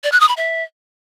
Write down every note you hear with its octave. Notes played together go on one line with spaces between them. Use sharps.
D5
F#6
D#6
B5
E5